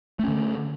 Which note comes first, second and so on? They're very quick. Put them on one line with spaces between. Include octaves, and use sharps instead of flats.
A3 C#4 D3